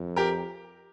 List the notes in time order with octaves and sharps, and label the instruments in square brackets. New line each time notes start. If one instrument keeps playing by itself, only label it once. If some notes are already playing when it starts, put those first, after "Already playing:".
Already playing: [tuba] F2
[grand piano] G4 A#4